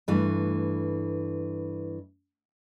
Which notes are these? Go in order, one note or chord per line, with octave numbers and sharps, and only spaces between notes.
G2 E3 A3